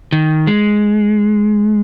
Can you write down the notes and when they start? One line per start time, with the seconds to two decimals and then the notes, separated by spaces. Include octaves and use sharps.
0.12 D#3
0.47 G#3